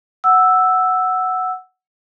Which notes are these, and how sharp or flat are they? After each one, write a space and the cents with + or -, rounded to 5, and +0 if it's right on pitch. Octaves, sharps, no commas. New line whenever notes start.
F#5 +0 E6 +0